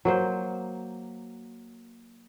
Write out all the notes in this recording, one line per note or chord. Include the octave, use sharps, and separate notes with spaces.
F#3 A#3 C5